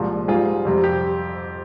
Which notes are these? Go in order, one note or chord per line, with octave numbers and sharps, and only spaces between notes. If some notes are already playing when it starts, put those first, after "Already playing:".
Already playing: C2 A#2 F3 G#3
G#2 G3 F4 G#4
F2 C3 G3
G4